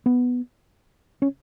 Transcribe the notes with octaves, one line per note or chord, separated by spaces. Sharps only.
B3
C#4